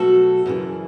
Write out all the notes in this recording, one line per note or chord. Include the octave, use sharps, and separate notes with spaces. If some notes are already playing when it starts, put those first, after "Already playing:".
Already playing: B2 F#3 A3 F#4 A4
F#2 C#3 E3